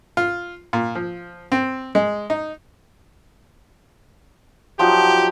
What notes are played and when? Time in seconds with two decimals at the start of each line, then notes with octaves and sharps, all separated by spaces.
0.17 F4
0.73 A#2
0.95 F3
1.52 C4
1.95 G#3
2.30 D#4
4.79 F3 F#3 D#4 G4